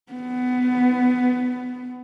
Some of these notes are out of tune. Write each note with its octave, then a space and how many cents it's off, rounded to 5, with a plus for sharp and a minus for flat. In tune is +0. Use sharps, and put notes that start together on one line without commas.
B3 +20